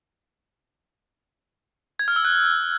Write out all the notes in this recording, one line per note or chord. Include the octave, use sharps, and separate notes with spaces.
G#6
F6
E6
F#6